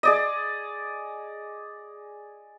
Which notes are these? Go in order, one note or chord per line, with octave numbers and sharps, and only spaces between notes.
G#4 D5 D#5